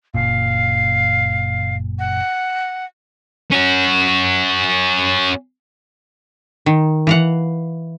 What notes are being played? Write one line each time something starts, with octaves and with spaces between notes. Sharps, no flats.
F#1 A#2 F5
F#5
C#4 F#4
D#3
E3 F5 F#5